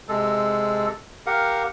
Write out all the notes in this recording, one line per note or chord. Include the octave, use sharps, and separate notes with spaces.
C3 G#3 A4
G4 A#4 F5 F#5